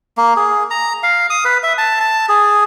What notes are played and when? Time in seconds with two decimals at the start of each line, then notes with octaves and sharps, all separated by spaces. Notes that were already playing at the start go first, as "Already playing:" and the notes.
0.17 A#3
0.37 G#4
0.71 A#5
1.03 F5
1.30 D#6
1.45 B4
1.63 E5
1.78 A5
2.00 A5
2.29 G#4